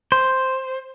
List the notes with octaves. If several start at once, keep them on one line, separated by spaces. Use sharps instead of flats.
C5